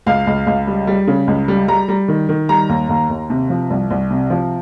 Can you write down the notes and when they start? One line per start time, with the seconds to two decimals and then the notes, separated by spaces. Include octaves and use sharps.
0.06 C#2 F5
0.27 C#2
0.47 C#2
0.67 G3
0.87 G3
1.07 C#3
1.27 C#2
1.48 G3
1.68 G3 A#5
1.88 G3
2.08 D#3
2.29 D#3
2.49 G3 A#5
2.69 D#2
2.89 D#2
3.09 D#2
3.30 C3
3.50 F3
3.70 C2
3.90 C2
4.11 C3
4.30 F3